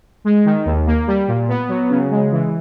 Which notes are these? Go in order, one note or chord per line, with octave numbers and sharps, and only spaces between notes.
G#3
D#3
D#2
A#3
G3
A#2
B3
F#3
C#3
G#3
E3